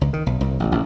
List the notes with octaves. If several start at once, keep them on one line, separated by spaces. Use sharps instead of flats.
C#2
D#3
B1
C2
A1
A1